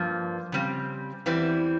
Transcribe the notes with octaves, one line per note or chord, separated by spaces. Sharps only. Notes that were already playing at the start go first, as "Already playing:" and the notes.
Already playing: G2 F3 A#3
C#3 G3 C4
E2 E3 G3 C4 E4